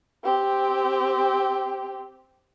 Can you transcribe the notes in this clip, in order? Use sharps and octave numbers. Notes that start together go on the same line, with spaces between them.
C4 G4